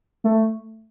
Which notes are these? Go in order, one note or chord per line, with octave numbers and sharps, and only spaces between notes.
A3